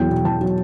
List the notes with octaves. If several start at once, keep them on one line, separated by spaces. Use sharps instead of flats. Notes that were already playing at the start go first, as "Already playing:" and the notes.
Already playing: E2 F#3 G5
B2
E2 A5
F#3